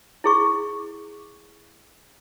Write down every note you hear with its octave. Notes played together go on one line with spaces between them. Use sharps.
E4 G#4 C#6